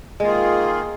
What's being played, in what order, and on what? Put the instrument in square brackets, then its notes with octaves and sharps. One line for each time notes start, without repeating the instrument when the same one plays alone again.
[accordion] D#3 A#3 F4 G#4 [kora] G#3